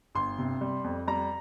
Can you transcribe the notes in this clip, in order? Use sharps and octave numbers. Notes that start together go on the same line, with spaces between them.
G1 C6
C3
G3
F2
G3 A#5